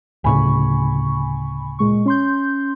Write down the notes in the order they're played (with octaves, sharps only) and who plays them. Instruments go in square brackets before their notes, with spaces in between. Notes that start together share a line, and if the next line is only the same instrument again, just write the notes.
[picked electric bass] D2 A2 C#3 [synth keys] G#5 B5 C#6
[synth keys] A#2 G#3 C#6
C#4 C6 G6